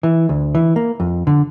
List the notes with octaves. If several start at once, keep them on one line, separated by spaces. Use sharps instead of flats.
E3
D2
E3
A#3
F2
D3